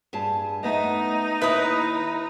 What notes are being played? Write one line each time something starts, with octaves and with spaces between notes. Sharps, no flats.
G2 G#4 A5
A3 B3 D#4 D#5
D#2 E4 B4 E5 D#6